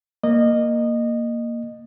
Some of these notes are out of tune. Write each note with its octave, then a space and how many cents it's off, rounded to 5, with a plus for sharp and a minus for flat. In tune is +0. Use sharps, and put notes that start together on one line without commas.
A#3 +0 D#5 -20